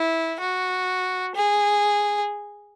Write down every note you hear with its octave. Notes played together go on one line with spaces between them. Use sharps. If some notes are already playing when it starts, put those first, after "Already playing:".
Already playing: E4
F#4
G#4